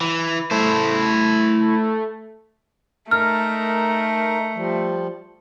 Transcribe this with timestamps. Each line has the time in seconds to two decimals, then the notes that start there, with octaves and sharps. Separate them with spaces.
0.01 E3
0.51 A3 E4 C5
3.11 A3 D#4 A#4 A#5 F6
4.55 F3 G3